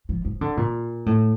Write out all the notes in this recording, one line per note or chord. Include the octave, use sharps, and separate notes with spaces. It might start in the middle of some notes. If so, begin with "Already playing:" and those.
F3
F3
D3
A#2
A2